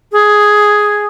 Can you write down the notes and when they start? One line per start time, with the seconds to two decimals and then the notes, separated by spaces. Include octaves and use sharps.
0.12 G#4